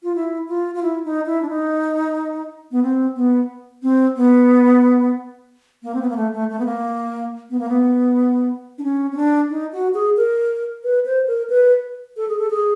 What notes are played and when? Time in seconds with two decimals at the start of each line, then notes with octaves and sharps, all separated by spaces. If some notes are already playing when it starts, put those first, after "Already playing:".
0.03 F4
0.15 E4
0.48 F4
0.75 F4
0.83 E4
1.05 D#4
1.26 E4
1.42 D4
1.49 D#4
2.71 B3
2.82 C4
3.16 B3
3.83 C4
4.16 B3
5.83 A#3
5.94 C4
6.01 B3
6.09 A#3
6.16 A3
6.33 A3
6.49 A3
6.59 B3
6.66 A#3
7.50 B3
7.59 A#3
7.69 B3
8.78 D4
8.83 C#4
9.12 C#4
9.16 D4
9.50 D#4
9.73 F#4
9.94 G#4
10.17 A#4
10.84 B4
11.05 C5
11.27 A#4
11.50 B4
12.17 A4
12.28 G#4
12.39 A4
12.50 G#4